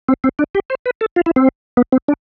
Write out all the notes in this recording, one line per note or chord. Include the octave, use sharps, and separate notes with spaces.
C4
C4
D4
G4
C5
B4
A4
F4
E4
C4
B3
C4
D4